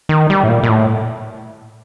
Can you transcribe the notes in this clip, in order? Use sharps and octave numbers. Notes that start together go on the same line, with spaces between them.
D#3
G3
A2
A#2
A#2
A2